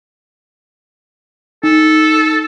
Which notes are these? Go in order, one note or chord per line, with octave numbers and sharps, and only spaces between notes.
D#4 A4